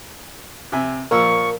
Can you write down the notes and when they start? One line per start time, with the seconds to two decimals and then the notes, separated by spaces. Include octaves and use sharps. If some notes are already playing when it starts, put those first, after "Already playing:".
0.72 C3 E5 G#5
1.11 A#2 F3 A#4 C#6 E6